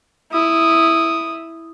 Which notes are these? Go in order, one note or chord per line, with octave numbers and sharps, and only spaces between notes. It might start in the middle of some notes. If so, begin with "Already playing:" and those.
E4 D#6